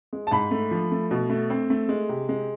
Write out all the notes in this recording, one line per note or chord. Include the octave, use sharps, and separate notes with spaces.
G#3
A5
G#2 B5
A3
F3
A3
B2
A3
C4
A3
G#3
C3
G#3